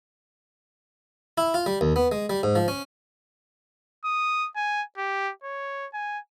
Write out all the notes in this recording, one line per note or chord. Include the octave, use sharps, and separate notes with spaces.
E4
F4
G3
D#2
B3
G#3
G3
G#2
F3
C#4
D#6
G#5
G4
C#5
G#5